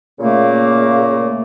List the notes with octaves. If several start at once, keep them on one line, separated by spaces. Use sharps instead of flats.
A#2 C#3 A3 A#3